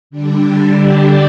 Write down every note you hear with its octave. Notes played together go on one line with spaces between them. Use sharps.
D3 G3 D4
D3 G3 D4 G4